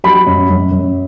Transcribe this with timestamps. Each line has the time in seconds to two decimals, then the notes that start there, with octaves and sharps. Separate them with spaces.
0.04 F#3 B5
0.27 F#2
0.50 F#2
0.71 F#2